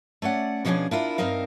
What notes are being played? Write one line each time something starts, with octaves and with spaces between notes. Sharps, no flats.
A3 C#4 D5 F#5
B2 F3 G3 C#4 D4 G#4
D4 E4 F4 A#4
G2 C4 D#4 A#4 F5